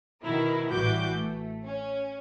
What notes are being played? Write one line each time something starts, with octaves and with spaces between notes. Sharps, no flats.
B2 D#3 E4 A#4
A1 E3 G3 F#4 D6 G6
A3
C#4